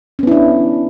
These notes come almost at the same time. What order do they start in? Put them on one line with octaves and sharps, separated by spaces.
C#4 B3 E4 D4